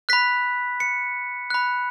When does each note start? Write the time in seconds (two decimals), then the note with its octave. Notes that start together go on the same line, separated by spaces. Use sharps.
0.09 B5 F#6 B6
0.80 C#7
1.50 B5 F#6